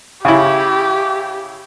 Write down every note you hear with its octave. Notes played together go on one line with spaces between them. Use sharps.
C#3 E4 G4